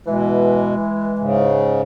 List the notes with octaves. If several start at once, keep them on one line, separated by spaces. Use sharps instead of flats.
B2 E3 G#3
G#2 C#3